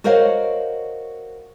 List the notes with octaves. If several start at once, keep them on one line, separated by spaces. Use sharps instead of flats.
F#4 A#4 C5 C#5 D#5 F5